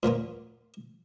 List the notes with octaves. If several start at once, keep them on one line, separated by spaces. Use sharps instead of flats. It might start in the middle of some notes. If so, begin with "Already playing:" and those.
A#2 F3 A#3 B3